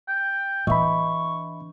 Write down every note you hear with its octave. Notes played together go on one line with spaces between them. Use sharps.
G5
E3 D4 D#5 E5 B5 C#6